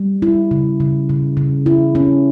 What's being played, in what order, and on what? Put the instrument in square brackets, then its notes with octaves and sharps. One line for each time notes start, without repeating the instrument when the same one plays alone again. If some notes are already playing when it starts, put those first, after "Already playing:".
Already playing: [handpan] G3
E4
C#3
C#3
C#3
C#3
E4
C#4